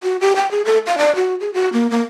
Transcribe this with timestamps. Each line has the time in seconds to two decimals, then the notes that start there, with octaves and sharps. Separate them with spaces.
0.03 F#4
0.21 G4
0.36 G5
0.51 G#4
0.65 A4
0.87 F5
0.98 D5
1.16 F#4
1.40 G#4
1.54 F#4
1.73 A#3
1.91 A#3